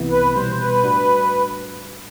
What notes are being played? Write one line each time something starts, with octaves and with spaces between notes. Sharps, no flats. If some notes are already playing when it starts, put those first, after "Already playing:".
Already playing: C2 C3 E3 B3 E4
B4
B2 G3 B3 C5
B4
A2 G3 D4 F#4